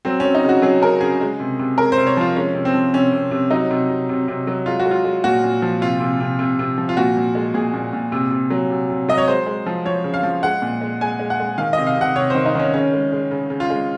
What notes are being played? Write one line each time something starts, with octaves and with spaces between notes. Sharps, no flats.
F#3 C4
F#3 C#4
D#4
C#3 F#4
F#3 G#4
C#3 A#4
C#3 G#4
G#3
C3
C3
G#3 A#4
C5
C3
C#5
F3 F4
G#3 C#4
C3
C4
F3
C3 C#4
C3
C3
F#3 D#4
C3
C3
C3
C3
F#3
G#3 F4
F#4
G#3
F4
G#3
A#2 F#4
A#2
F3
C3 F4
C3
C3
C3
C3
F3
F4
A#2 F#4
A#2
G#3
A#2 G#4
A#2
A#2
C3
C3
F#3
C3
C3
F#3 D#5
C#5
G#3 C5
G#3
F3
F3 C#5
C#3
F5
F3
G#3 F#5
A#2
G#3
G#3 G#5
G#3
F#5
G#3
D#3 F5
C3 D#5
F5
C3 F#5
C3 C#5
D#3 C5
D#4
D#3 C#4
C#3 C#4
G#3
G#3
C#3
C#3
F4
G#3